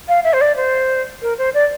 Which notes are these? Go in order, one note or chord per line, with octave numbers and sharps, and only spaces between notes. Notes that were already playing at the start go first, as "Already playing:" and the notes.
F5
E5
C5
D5
C5
A#4
C5
D5